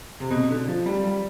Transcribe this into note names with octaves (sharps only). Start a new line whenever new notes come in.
C3
B2
D3
F3
G3
G3